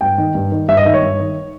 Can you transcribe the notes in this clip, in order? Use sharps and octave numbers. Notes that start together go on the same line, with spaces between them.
G2 G5
D#3
G2
D#3
G2 E5
D#5
D#3 E5
C#5
G2
D#3